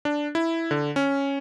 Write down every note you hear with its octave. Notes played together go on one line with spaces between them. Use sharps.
D4
E4
D3
C#4